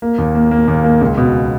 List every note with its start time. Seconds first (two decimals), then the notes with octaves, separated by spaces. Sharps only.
0.02 A#3
0.18 D#2
0.35 A#3
0.51 A#3
0.68 D#2
0.84 A#3
1.01 C#2
1.17 B2